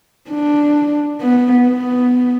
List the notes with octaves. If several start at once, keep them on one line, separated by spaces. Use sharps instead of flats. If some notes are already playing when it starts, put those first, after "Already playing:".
D4
B3
B3